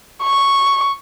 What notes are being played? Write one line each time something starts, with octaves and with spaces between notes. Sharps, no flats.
C#6